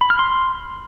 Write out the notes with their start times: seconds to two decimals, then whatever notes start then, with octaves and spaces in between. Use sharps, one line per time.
0.01 B5
0.10 F6
0.19 C6